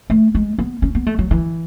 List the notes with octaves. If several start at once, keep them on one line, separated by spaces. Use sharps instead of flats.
A3
G#3
B3
C#4
B3
A3
F#3
E3